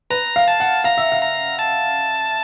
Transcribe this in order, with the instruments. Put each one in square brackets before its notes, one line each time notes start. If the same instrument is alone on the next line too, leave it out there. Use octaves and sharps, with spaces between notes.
[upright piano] B4 [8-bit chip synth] A#5
[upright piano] F5
[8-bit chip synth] A5
[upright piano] F#5
[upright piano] F5 [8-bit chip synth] A#5
[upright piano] E5
F5
[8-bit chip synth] A#5
A5